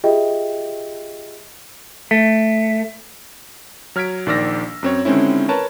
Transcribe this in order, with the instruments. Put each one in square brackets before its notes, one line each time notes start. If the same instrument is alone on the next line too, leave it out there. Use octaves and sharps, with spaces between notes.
[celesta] F4 G4 G#4 D#5 E5 G5
[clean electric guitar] A3
[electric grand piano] F#3 F6 G#6 B6 D7
A#1 D#3 D5 E6 F6 A#6
F#2 C4 C#5
D3 D#3 G#3 C4 C#4 E4
A#4 B4 C#5 A5